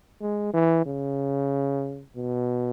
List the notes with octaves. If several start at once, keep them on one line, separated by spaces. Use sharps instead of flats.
G#3
E3
C#3
B2